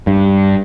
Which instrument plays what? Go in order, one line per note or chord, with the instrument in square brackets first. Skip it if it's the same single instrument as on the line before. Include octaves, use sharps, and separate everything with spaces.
[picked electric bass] G2